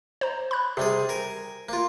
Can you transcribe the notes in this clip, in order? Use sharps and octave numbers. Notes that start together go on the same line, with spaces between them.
C5 A#5
B5 F#6
C3 G3 G4 G#4
A#4 G#5
A#3 F4